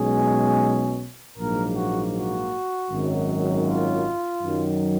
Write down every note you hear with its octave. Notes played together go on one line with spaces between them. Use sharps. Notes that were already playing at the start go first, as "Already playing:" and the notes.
Already playing: B1 B2 G#3 C#4 G#4
A#1 G#2 F#3 A#3 A#4
F#4
F#4
G#1 F#2 D#3 F#3
F4
F#2 D#3 F#3